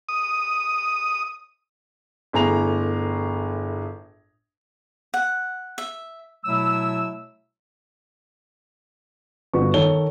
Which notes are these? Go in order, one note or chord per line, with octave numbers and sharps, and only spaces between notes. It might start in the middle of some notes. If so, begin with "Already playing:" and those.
D#6
G1 A2 G#4 A#5 F7
F#5
E5
B2 F#3 A3 E4 E6
G1 B3 F#4 C#6
D#3 A4 C#5 G7